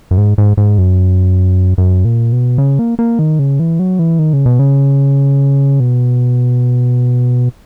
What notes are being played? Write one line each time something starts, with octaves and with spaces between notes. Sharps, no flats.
F#2
G#2
G#2
G#2
F#2
F#2
A#2
B2
C#3
A#3
A#3
D#3
C#3
E3
F#3
E3
D#3
C#3
B2
C#3
B2